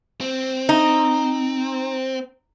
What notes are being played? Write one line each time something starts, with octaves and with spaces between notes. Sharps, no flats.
C4
D#4